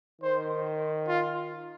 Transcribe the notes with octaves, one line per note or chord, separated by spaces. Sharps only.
D#3 C5
F4